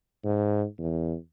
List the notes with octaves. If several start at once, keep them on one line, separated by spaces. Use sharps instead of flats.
G#2
E2